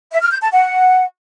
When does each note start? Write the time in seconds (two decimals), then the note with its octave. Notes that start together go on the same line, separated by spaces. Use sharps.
0.12 E5
0.21 F6
0.31 G6
0.41 A5
0.51 F#5